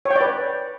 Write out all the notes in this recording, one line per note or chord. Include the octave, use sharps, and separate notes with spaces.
C#5
G5
D5
B4